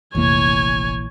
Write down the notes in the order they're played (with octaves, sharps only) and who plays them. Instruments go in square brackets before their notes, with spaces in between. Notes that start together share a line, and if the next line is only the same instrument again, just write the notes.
[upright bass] F1 [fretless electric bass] A#1 E3 A#3 [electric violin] C#5 G#5